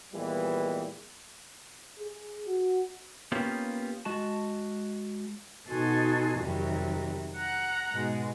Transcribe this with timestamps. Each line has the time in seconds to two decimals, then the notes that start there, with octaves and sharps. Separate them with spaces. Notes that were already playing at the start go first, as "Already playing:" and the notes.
0.14 A#2 E3 F3 G3 G#3 B3
1.99 G#4
2.47 F#4
3.32 A#3 B3 C#4 F4 G4
4.05 G#3 F#4 A5
5.69 B2 D#4 F#4 A4 G#5 C6
6.39 F2 C3 D#3 F#3 G3
7.37 F#5 A#5 F#6
7.92 G#2 B2 G#3